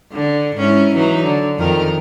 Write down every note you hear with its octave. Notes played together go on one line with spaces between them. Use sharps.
D3
G#2 C#4 E4
E3 F#3 D#4
D3
F2 D#3 A#4